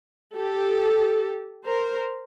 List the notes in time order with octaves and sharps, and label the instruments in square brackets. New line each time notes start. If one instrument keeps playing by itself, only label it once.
[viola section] G4 A4
A#4 C5